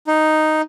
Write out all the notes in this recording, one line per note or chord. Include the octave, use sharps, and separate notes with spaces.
D#4